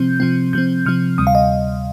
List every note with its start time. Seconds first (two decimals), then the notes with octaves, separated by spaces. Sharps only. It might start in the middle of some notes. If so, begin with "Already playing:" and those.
Already playing: C3 F3 C4 G6
0.20 C3 F3 C4
0.53 C3 F3 C4 G6
0.86 C3 F3 C4 F6
1.18 D2 C3 G3 D#6
1.27 F5
1.35 D#5